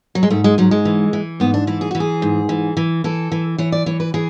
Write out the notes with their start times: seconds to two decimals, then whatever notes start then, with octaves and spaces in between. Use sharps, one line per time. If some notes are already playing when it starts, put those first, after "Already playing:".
0.15 F#3
0.23 G#3
0.30 G#2 A3
0.44 G#3
0.58 G#2 F#3
0.71 G#3
0.85 E3
1.13 E3
1.40 G#2 B3
1.54 D4
1.67 E3 E4
1.81 G#4
1.91 E3 F#4
2.00 G#4
2.22 G#2
2.49 E3
2.77 E3
3.04 E3 A4
3.32 E3
3.58 E3 C#5
3.72 D5
3.86 E3 C#5
4.00 B4
4.14 E3 G#4